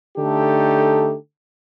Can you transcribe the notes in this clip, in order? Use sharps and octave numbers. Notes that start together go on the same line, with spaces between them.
D3 A3 D#4 G4 A4